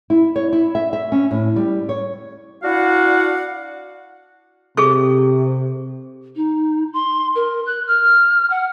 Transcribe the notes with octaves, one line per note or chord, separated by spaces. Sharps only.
E4
C#5
E4
E5
E5
C#4
A2
G3
C#5
D4 E4 F#4 F5 F#5
C3 G#4 A4 C#6
D#4
C6
A#4
F#6
F6
F#5